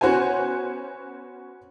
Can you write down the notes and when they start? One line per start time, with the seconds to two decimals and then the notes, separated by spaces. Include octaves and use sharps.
0.01 B3 C#4 F#4 C5 C#5 G#5